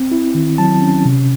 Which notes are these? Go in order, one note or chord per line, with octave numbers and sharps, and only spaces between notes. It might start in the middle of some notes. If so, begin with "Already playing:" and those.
Already playing: C4
E4
D#3
F#3 A5
C#4
C3